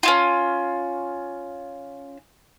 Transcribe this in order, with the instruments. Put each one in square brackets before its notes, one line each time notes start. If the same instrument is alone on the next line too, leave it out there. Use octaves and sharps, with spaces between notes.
[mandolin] C#4 E4 F4